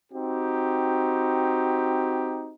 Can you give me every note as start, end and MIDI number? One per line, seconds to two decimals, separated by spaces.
0.12 2.53 60
0.12 2.53 63
0.12 2.53 66
0.12 2.53 67